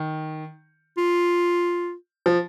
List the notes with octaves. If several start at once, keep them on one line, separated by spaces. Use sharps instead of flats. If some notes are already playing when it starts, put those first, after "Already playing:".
Already playing: D#3
F4
F3